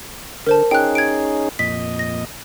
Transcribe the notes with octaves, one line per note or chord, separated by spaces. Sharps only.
D3 A#4 C5 A5
C#4 D#4 G#4 G5 F#6
G#6 D7
F2 A#2 D#5 B6
A#6